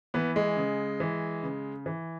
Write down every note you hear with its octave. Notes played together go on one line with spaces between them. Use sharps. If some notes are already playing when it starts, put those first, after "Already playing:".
E3 B3
G#3
C#3
E3
C#3
E3